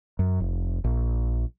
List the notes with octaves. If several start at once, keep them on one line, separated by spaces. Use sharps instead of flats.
F#2
F1
A#1